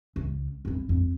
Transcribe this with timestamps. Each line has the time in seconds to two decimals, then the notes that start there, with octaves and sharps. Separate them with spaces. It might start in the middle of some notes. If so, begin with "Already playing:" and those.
0.16 C#2
0.65 F2 E4
0.89 F2